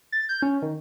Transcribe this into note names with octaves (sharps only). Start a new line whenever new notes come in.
A6
G6
C#4
D#3